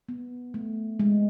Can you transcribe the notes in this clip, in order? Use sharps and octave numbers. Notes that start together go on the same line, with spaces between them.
B3
A3
G#3